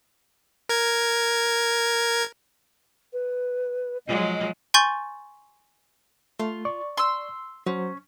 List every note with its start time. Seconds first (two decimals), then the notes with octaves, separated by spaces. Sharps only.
0.69 A#4 G#6
3.13 B4
4.07 F3 F#3 G#3 D#5
4.74 G#5 C6 C#6 G6 A6
6.40 A3 F4
6.65 D5 C#6
6.97 C6 E6
7.66 F#3 C#4 C5